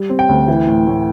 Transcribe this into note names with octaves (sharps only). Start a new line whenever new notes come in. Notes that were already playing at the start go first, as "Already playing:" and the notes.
Already playing: G3
C4
G5
D2
E3
A2
A2